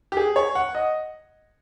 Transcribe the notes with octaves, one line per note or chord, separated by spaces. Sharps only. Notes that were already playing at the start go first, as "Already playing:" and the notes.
G4
G#4
C#5
F#5
D#5